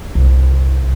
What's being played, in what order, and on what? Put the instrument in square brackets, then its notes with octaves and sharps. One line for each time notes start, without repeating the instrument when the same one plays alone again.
[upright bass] C2